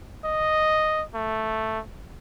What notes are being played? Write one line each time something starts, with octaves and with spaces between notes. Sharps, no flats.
D#5
A3